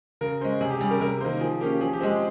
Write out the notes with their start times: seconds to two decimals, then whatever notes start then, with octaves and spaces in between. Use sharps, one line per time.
0.21 C#3 A#4
0.41 G#3 C#4 C5
0.61 C3 G#4
0.70 G4
0.81 G3 C#4 G#4
0.91 A#4
1.01 C3 A#4
1.21 D#3 A#3 C5
1.41 F3 G#4
1.61 A#3 C#4 G4
1.81 F3 G#4
1.93 G4
2.01 G#3 C4 G#4